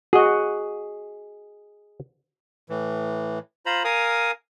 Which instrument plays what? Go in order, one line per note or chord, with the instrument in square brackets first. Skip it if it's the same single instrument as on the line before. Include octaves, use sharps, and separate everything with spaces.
[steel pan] F#4 [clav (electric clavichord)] G#4 D#5
[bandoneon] A2 E3
F4 C5 A#5 B5
A#4 F5 G#5 D#6